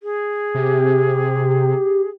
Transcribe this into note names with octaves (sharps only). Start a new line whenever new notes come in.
G#4
C3 G4